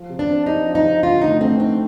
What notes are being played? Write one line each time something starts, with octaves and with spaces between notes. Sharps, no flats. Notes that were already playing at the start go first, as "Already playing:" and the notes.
Already playing: F3
C3
D4
C4
D#4 G4
F3
D#4
C3
D3 F4
D2 D#4
A3 C4
C4 D#4